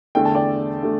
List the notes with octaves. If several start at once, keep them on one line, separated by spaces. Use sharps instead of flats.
E2 D3 A3 G5
A5
D5 G5
D3 A3